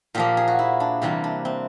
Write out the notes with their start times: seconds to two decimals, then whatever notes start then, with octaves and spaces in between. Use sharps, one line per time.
0.15 A#2 F3 A#3 G4
0.37 G#4
0.48 F#4
0.59 E4
0.80 D4
1.02 C3 E3 G3 A#3 C4
1.24 D4
1.45 C4